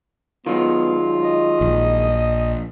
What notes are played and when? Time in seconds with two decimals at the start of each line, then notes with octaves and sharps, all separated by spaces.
0.46 D#3 F#3 G#3 B3 F4
1.24 D#5
1.61 A#1